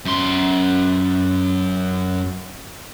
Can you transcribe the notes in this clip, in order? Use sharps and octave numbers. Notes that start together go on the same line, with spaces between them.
F#2 C6